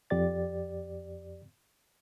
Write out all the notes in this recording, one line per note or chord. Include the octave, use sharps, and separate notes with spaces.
F2 G4 D5 A6